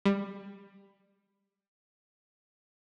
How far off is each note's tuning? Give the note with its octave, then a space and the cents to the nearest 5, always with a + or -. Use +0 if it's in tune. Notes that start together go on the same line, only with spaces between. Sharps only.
G3 +20